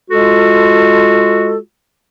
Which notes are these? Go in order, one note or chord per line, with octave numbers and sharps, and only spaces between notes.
G#3 F4 F#4 A4